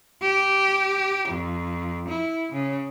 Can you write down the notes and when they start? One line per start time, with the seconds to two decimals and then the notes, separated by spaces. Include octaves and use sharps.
0.22 G4
1.29 F2
2.09 E4
2.53 C#3